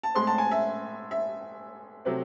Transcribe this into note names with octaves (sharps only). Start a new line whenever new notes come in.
A5
A2 G#3 C4 C6
A5
G#5
E5
E5
C3 F#3 A3 C4